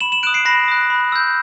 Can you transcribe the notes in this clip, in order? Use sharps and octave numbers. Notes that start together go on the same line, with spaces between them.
B5 E7 F#7
E7 F#7
D#6 F#6 D7 E7
C7 D7
B5 A#6 C7
D#6 F#6
B5
E6 G6